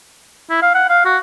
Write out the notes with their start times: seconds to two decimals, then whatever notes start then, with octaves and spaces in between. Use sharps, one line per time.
0.50 E4
0.62 F5
0.75 F#5
0.89 F5
1.05 F#4